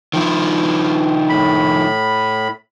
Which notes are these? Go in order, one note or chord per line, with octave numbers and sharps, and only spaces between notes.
D#3 F3 E4
A2 B5